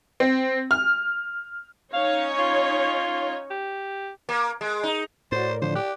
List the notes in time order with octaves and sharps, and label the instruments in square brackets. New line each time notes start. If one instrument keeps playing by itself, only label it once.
[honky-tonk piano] C4
F6
[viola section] C#4 D#4 C#5 [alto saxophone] F5
[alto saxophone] F4
G4
[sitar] A#3
G#3
D#4
[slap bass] A2 [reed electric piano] F#4 A6 [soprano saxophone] C5 [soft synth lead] D5
[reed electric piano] A#4
[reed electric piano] D3 F3 [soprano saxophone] C5
[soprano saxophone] G4 [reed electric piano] D6 F#6